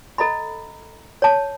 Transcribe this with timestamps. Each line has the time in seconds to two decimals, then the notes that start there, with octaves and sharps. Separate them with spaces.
0.18 A4 D#5 A#5 B5
1.22 C#5 A5